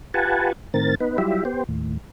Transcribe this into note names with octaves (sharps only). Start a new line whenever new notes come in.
F4 G4 B4 F#5 G#5 A5
A2 D#3 C4 A#4 A6
B3 D#4 B4
F#3 G3 E4 F4 G4 E5
B3 G4 C5
D#2 A2